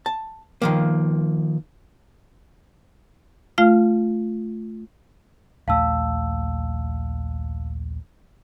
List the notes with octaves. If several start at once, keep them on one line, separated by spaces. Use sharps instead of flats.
A5
D#3 F3 A#3
A3 F4 F5 F6
A#1 D#2 A3 F5 A5 E6